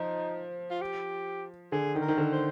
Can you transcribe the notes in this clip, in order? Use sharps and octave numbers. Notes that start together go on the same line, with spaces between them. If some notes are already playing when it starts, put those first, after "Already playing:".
Already playing: F3 D#4
F4
G4
D3 G#4
D#3
A#4
D#3
D3
C5